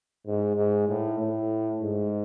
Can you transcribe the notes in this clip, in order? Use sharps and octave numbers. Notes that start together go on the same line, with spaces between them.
G#2
G#2
A2
A2
G#2